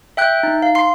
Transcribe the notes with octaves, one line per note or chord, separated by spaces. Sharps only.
E5 G5 F#6 G6
D#4
F5
C6 C7